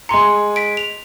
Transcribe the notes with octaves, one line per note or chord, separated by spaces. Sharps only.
G#3 G#5 A#5 C6 C#7
B6 D7
F7